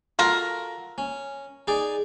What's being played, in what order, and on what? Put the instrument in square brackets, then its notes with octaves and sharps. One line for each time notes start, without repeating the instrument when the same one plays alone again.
[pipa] F4 A#4 [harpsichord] F#4 A4
[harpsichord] C#4
D#4 G#4 D5